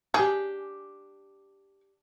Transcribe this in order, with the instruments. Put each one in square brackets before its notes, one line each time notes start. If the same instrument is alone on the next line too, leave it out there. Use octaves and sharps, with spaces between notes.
[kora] D4 G4 [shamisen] G#4